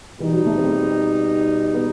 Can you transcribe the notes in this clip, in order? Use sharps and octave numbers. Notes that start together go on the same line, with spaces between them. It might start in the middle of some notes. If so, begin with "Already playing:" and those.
B2 E3 G3 D#4
F#3
A3
C4
B3